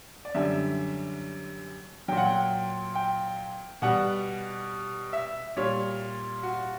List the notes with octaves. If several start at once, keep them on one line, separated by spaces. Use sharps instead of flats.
D5
F#2 D3 G3 E5
A#2 F#3 G5
F#5
G5
G5
B2 G3 F#5
E5
A#2 G3 C#5
F#4